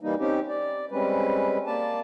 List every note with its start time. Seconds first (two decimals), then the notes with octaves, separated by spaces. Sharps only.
0.01 E3 G3 A#3 D#4
0.19 C4 C#4 D#4 G4
0.49 D5
0.92 G3 G#3 C4 C#4 B4
1.66 A#3 D5 A5